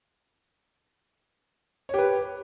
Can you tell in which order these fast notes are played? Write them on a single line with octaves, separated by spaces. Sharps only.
C#5 G4 B4